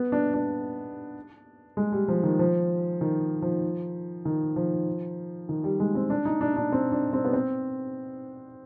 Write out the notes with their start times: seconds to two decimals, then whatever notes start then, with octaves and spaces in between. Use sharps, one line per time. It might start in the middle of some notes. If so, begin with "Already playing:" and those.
Already playing: B3
0.12 D4
0.34 D4
1.77 G#3
1.92 G3
2.08 F3
2.23 D#3
2.39 F3
3.01 D#3
3.42 F3
4.25 D#3
4.56 F3
5.49 D#3
5.64 G3
5.80 G#3
5.95 C4
6.10 D4
6.25 D#4
6.41 D4
6.56 D4
6.72 C4
6.92 D4
7.13 C4
7.25 B3
7.33 C4